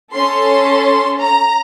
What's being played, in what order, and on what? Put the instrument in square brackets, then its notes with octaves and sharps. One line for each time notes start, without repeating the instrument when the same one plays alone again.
[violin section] C#4 A4 C6
A#5